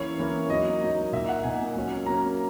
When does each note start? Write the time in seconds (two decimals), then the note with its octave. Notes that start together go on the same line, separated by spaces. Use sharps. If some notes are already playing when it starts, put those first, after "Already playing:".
Already playing: E3 A#3 C#4 E4 C#5
0.19 E3 A#3 C#4 E4
0.50 F#3 A#3 D#4 D#5
0.81 F#3 A#3 D#4
1.12 A#2 A#3 D#4 E5
1.29 F#5
1.44 A#2 A#3 D#4 G#5
1.75 F#3 A#3 C#4
2.06 F#3 A#3 C#4 A#5